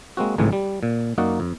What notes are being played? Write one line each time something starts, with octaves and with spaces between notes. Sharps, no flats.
G#3 A#3 C4 F#4
G#1 C#2 A2 E3 F#3 G#3
G3
A#2
F#2 A#3 D#4 F#4 D5 F#5
F2